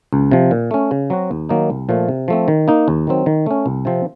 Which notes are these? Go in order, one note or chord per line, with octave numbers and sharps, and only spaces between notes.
C#2
C3 F3
A#2
A3 C#4
C#3
F#3 C4 F#4
D#2
D#3 F#3 A#3 D#4
C2
A#2 F3 A3
C3
F3 A3 C4
D#3
A#3 D#4
D#2
D#3 F#3 C4
D#3
A3 C#4
C2
C3 F3 C4